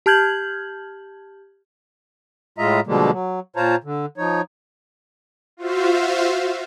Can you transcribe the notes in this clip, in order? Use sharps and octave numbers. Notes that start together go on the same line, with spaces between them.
G4 A5 F6 G6 G#6 F#7
A2 G#3 F4 D#5 E5 A#5
B2 D3 F3 G3 G#3 A#3
F#3
A#2 F4 C5 C#5 A5 A#5
D3
F3 D#4 C#5
F4 F#4 C5 E5 F5